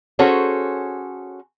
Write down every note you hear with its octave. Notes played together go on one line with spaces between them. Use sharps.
C#4 F#4 G#4 A4 C5 C#5